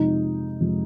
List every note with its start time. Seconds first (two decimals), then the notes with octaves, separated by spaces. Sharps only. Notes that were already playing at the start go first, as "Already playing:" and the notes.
Already playing: F2 C3 F3 G#3 D#4
0.60 F2 C3 F3 G#3